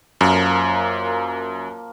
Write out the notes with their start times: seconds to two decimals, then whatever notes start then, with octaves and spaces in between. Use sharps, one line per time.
0.21 F#2 F3 A#3 A#4